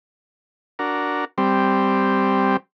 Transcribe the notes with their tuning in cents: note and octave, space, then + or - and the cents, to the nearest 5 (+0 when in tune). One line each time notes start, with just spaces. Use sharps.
D4 -5 F#4 +0 A#4 +0
G3 +0 C4 +0